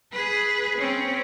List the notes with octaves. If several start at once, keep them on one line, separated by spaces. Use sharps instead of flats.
G#4 B4
C4 C#4